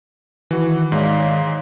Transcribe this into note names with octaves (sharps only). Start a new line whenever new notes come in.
D#3 E3 F#4
G#2 G#3 C#5 D5 F5